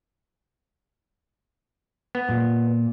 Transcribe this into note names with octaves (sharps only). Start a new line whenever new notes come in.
B3
A#2